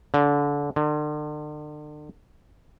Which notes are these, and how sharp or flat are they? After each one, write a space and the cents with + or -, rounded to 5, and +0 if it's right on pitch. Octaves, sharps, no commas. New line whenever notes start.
D3 -25
D3 +40